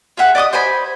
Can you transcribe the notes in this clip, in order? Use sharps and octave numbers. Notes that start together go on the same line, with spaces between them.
F4 G#4 E5 F#5
D5 D#5 D6 D#6
C5 D5 G#5 B5